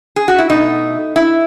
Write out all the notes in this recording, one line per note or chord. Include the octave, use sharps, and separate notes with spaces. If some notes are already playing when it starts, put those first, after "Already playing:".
G#4
F#4
E4
B2 A3 D#4
E4